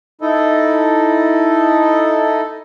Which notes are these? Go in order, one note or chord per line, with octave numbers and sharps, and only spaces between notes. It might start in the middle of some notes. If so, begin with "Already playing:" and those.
D#4 E4 A4 D#5